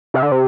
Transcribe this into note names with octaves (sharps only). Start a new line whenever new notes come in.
C3
D3
C3